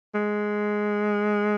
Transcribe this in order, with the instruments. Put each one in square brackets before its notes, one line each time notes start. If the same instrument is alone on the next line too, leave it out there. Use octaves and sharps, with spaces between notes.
[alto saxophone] G#3